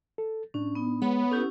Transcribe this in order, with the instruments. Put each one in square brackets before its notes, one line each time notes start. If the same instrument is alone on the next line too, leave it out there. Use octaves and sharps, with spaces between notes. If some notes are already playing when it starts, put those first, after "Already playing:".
[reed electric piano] A4
[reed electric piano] A2 D4 [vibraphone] C#4
[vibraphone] B3 D#4
[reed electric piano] G#3 [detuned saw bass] B3 [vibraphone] C#5 B5
[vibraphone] C#4 E4 G4 [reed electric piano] A4 G6